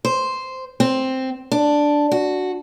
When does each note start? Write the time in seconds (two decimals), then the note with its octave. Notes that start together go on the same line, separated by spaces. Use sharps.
0.05 C5
0.80 C4
1.52 D4
2.12 F#4